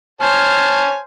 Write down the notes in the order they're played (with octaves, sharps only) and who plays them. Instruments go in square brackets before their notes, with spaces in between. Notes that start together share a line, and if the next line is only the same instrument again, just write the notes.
[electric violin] C5 F6 [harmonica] C#5 G#5 A5